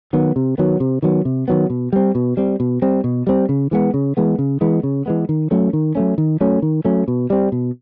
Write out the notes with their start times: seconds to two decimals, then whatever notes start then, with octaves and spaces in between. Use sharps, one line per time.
0.13 D#3 F#3 B3
0.36 C3
0.58 D#3 F#3 B3
0.80 C3
1.02 D#3 F#3 B3
1.25 C3
1.48 D#3 F#3 B3
1.70 B2
1.93 G3 C4
2.15 B2
2.37 G3 C4
2.60 B2
2.82 G3 C4
3.04 B2
3.27 G3 C4
3.49 C#3
3.71 E3 G#3 B3
3.94 C#3
4.17 E3 G#3 B3
4.39 C#3
4.61 E3 G#3 B3
4.83 C#3
5.06 E3 G#3 B3
5.29 D#3
5.51 F#3 A3 C#4
5.73 D#3
5.95 F#3 A3 C#4
6.18 D#3
6.41 F#3 A3 C#4
6.62 D#3
6.85 F#3 A3 C#4
7.08 B2
7.30 G3 C4
7.52 B2